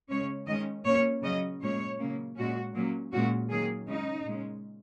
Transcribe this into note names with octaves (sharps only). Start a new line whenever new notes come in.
C#3 G#3 C#4 C#5
D#3 G#3 C#4 D#5
A#2 A#3 C#4 C#5
C#3 F#3 C#4 D#5
A#2 G#3 C#4 C#5
C#3 F#3 A#3 C#4
A#2 G#3 C#4 F#4
A#2 F#3 A#3 C#4
A#2 G#3 C#4 F#4
D#3 F#3 A#3 C#4 G#4
C#3 G#3 C#4 D#4
A#2 G#3 C#4